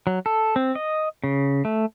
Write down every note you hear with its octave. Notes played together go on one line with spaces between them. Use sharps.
F#3
A4
C4
D#5
C#3
A3